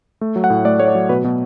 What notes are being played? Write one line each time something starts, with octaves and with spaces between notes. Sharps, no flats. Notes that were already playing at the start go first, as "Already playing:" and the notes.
A3
F#3
F#5
A2
A3 D5
A3 C#5
D5
F#3
B2 B4
B2